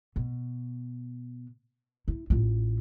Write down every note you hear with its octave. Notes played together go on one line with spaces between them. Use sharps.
B2
E4
A1 F4